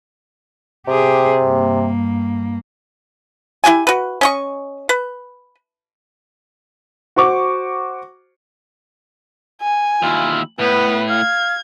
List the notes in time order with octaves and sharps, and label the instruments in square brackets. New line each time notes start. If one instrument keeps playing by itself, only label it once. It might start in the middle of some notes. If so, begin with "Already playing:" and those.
[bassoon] C3 [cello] G4 G#4
[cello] G2 A#3
[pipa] E4 F#4 G4 G#5
F#4 B4
C#4 D#5 C#6
B4
[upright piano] F#4 C5 C#6 D6
[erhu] G#5
[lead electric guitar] D#2 E4 [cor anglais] F4
[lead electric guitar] A2 [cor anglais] B3 [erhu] B4
[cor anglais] F5 [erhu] G#6